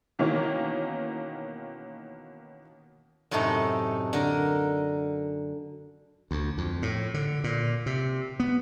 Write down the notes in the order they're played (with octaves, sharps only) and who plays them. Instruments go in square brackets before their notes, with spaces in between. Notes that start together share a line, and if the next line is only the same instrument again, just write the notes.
[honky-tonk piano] B2 D#3 E3 A#3 C#4
[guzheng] F#2 A2 C3 D#4 A4
D3 A#4
[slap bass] D2
F2
A2
D3
A#2
C3
B3